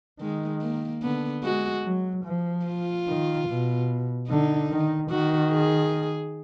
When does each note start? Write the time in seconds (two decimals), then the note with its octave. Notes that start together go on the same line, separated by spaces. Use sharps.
0.20 D#3 G#3
0.62 A#3
1.02 D3 B3
1.43 G#3 F#4
1.85 F#3
2.25 F3
2.66 F4
3.07 D#3
3.48 B2
4.29 D3 D#4
4.70 D#3
5.10 D#3 F#4
5.52 G#4